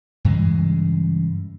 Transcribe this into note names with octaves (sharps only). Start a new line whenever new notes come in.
G2 C#3 E3 G#3